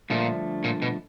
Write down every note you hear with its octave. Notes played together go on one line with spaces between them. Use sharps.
G2 A#2 D3 F3 A3 D4
A#2
B2